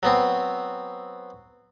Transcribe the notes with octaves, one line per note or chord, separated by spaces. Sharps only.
F#3 B3 C4